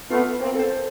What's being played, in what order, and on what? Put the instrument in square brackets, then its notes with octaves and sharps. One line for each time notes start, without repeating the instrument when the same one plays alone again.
[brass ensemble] A3 B3 [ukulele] F4
[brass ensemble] A#3 C4
[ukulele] A4 C5